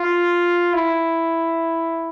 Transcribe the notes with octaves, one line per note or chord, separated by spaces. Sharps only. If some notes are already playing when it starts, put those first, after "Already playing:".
Already playing: F4
E4